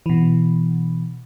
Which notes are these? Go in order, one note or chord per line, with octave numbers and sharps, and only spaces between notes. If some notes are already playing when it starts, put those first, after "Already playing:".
B2 E3